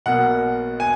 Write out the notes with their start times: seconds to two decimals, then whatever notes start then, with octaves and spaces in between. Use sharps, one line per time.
0.06 B1 B2 A#3 F#5
0.80 G#5